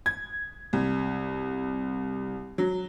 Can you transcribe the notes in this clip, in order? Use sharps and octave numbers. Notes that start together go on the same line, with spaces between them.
G#6
C2
F#3